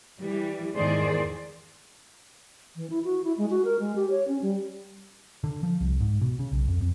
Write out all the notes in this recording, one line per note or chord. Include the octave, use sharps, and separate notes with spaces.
E3 G3
E2 G#2 D#3 G#4 C5 D5
E3
E4
F#4
E4
G#3
F#4
A#4
G#3
G4
C#5
C#4
G3
D3
F3
C2
G#2
B2
C#3
B1
F2
F2